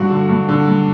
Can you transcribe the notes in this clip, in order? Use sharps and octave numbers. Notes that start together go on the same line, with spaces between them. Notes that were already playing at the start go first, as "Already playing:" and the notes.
Already playing: G2 F#4
D3
G2
D3
G2